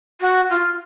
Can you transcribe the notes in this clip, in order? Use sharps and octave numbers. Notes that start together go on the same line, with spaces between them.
F#4
F4